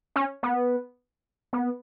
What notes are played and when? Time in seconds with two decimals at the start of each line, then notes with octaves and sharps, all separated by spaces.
0.16 C#4
0.43 B3
1.53 B3